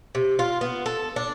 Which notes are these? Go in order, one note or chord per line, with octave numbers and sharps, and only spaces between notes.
C3
F4
B3
A4
D4